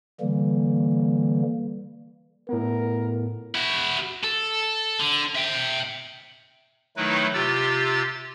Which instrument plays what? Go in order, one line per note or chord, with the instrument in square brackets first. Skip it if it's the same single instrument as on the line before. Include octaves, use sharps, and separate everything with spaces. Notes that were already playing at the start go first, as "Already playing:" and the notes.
[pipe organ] D3 E3 G3 A#3
[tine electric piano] A2 B3 [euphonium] A#4
[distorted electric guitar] E4 F#4
A4
D3
E5 G5
[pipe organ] D#3 F#3 A3 D#4 E4 B4
C3 F4 G4 E6 A6